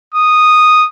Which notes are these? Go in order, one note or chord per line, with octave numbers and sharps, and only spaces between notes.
D#6